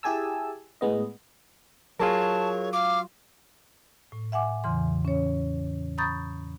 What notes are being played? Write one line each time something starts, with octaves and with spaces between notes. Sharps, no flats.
E4 G4 G#4 G#5 A5 E6
A2 G#3 B3 D#5
F#3 F4 G#4 A#4 C#5 A5
F5 D6
A2
E5 F#5 G#5 D6
E2 C#3 E3 C6
C#4 C#5
A#5 B5 C#6 D#6 G6 A6